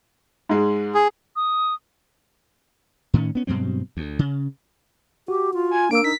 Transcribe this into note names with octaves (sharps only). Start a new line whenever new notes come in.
G#2 G#3
G#4
D#6
A2 D#3 C4 C#4
B3 C#4
G2 B2 F#3 C4
D2
C#3
F#4 G4
F4
G#5
A#3 D4 A#4 E6 D7
D#4 B6